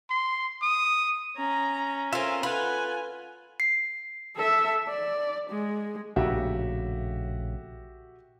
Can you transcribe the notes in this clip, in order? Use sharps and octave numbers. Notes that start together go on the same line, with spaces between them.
C6
D#6
C#4 A#5
C4 F4 A4 A#4 E5 G#5
F4 A4 B4 F#5 G#5 B5
C7
A4 E5
D5
G#3
A#1 A2 C#3 F#4 G4 E5